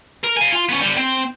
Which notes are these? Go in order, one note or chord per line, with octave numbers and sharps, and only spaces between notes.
A#4
F5 G#5
F4
B3 C#4
D3 G3
C4